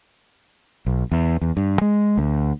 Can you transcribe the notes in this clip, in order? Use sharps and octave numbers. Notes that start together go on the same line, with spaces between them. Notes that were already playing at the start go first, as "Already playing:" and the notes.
B1
E2
E2
G2
G#3
D2